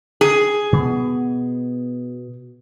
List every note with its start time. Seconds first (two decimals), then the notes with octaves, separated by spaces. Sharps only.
0.21 G#4
0.73 B2 B3